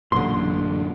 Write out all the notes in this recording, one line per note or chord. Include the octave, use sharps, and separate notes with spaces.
A1 F#2 A#2 D3 C6